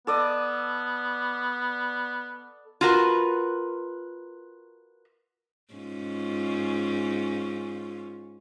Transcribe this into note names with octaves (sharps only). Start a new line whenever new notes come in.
B3 A4 D5 D#5
F4 F#4 A#4 B4
G#2 C#4 F4